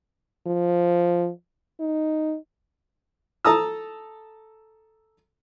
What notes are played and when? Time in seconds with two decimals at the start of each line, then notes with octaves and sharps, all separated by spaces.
0.47 F3
1.80 D#4
3.45 A4 A5 A#5 D#6 E6